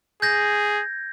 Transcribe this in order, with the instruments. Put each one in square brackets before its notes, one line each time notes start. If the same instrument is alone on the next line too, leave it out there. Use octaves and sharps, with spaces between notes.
[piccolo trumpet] G#4 [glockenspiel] G6 G#6 A#6